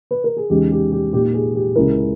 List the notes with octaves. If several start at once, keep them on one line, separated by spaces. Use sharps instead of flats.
B4
A#4
G#4
E2 C#3 G#3 D#4 G4
G4
G4
A#2 A#3 D#4 G4
G#4
G4
C#2 C#3 G#3 C#4 E4 A#4